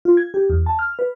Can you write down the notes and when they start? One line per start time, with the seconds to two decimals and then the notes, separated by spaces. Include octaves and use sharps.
0.05 F4
0.17 G#6
0.34 G4
0.50 E2
0.66 A5
0.79 F6
0.99 B4